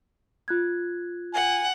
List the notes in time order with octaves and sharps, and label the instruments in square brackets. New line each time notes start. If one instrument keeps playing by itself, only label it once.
[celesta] F4 F#6 G#6
[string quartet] F#5 [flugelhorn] G#5